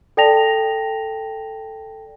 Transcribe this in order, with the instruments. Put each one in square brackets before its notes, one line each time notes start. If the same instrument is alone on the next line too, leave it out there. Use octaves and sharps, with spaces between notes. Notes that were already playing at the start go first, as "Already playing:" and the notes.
[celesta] A4 D5 G5 A5 A#6 F7